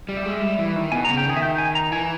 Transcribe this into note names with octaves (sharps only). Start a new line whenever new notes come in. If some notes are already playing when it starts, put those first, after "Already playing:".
G3
E5
G#3
G3
E3
D#3
B2 G#5
C#3 A#5
G5
D#3 G#4
E5
G5
G#5
A#5
E3 G#5